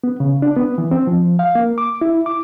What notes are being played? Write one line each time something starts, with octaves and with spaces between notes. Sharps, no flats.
B3
C#3
D4
B3
E3
C4
F3
F5
A#3
D6
E4
D6